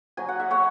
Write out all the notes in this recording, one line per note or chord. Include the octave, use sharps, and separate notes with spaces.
F#3 G#5
F#5
E5
C#5 F#5